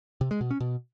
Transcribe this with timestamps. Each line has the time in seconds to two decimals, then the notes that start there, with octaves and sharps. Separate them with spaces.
0.21 C3
0.31 G#3
0.41 B2
0.51 C#4
0.60 B2